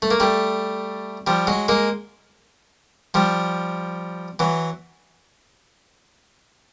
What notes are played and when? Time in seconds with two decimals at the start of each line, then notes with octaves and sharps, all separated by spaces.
0.02 A3
0.11 A#3
0.20 G3 A3
1.27 F3 G3
1.47 F#3 G#3
1.68 G#3 A#3
3.14 F3 G3
4.39 E3 F#3